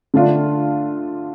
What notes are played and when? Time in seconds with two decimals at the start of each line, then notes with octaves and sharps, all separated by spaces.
0.14 D3 A3 D4 F4